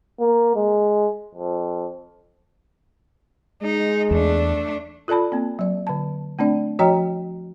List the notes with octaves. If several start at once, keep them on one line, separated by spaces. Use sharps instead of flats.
A#3
G#3
F2
G#3 D#4
E2 A3 D4
F4 A4 D5 A5 B5
A#3 C4
F#3 D5
D3 A5
A3 C4 D4 D5
F3 F#4 C#5 D#5 G5 A#5